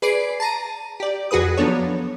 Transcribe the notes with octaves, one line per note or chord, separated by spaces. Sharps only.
G#4 B4 D5 C7 D7
A5 A#5 D#7
G4 D5
F2 F#4 G#4 B4 D#6
F3 F#3 B3 D4 A4 C#5